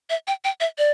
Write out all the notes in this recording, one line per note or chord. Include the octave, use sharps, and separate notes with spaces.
E5
G5
G5
E5
D5